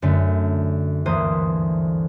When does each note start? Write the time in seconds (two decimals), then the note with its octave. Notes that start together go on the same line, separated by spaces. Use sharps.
0.02 F#2 D3 A3
1.06 G1 D2 E3 A#3 C5 D#6